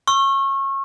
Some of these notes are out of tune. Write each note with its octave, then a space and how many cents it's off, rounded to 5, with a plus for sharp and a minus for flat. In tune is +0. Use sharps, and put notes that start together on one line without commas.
C#6 -25 E6 +35